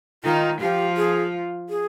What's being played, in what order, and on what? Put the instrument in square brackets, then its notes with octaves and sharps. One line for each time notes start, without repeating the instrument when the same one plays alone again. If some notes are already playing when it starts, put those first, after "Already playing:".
[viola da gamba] D#3 D#4 [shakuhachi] F4
[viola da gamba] F3 F4 [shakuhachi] G4
[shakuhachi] G#4
G#4